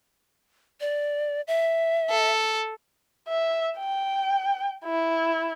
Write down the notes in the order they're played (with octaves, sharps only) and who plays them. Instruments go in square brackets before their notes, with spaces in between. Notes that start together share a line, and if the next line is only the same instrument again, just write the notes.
[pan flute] D5
E5
[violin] A4
[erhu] E5
G5
E4